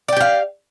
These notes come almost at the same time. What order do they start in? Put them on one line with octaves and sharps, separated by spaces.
D5 G5 G4 F5